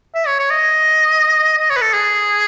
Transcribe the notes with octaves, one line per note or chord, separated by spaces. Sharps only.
E5
C#5
C#5
D#5
D#5
C#5
B4
A4
G#4